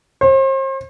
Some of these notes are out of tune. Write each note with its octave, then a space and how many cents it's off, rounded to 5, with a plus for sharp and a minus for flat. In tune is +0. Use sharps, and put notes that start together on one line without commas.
C5 +40